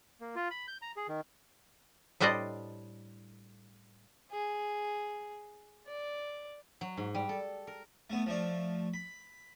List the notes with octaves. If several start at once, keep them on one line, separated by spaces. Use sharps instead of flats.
A#3
F4
B5
G6
A#5
G#4
D#3
A2 G3 D4 C5 D5 D#5
G#4
D5
F#3
G#2
G3
A4
A#4
A3 B3
F3 A3 D5
B5